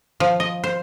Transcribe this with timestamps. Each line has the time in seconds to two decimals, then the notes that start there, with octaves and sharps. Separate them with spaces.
0.20 F3
0.40 D#5
0.64 C5